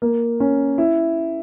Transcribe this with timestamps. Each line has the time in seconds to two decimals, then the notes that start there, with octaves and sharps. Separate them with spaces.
0.02 A#3
0.40 C#4
0.78 E4